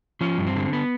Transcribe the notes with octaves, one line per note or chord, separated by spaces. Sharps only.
F3 C#4
G2
C4
D3
B3